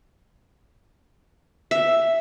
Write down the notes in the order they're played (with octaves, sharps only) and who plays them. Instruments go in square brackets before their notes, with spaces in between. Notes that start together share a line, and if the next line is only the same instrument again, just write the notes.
[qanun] E5